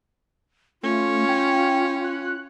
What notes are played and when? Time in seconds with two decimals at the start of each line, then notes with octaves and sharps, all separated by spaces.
0.83 A3 C#4 F4
1.29 G5
2.04 F#6